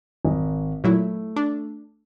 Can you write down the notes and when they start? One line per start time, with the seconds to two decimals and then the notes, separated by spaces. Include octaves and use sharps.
0.25 G#1 D#5
0.84 A#2 F#3 A3 E4
1.36 D4